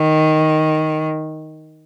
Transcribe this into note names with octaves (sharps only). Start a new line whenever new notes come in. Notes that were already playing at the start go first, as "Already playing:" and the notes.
Already playing: D#3